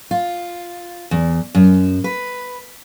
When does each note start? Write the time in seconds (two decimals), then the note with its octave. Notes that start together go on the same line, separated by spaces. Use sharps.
0.11 F4
1.11 E2
1.55 F#2
2.04 B4